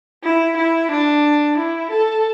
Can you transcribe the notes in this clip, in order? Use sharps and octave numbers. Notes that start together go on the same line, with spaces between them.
E4
E4
D4
E4
A4